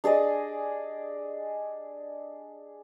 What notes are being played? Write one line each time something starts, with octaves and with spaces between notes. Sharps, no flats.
D4 G#4 D5 D#5